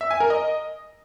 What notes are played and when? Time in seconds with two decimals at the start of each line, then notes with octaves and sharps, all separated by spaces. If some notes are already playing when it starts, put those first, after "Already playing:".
0.01 E5
0.11 G#5
0.20 A#4
0.30 D#5